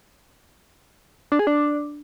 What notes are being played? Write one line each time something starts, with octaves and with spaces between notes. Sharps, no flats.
D4
G#4
D4